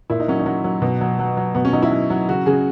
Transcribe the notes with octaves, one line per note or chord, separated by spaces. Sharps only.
A#2 E4
D#4
F#3 C#4
D#4
F#3
F#3
B2
F#3
F#3
F#3
B2 B3
C#4
F#3 D#4
E4
F#3
F#3
C#3 F#4
C#3 G#4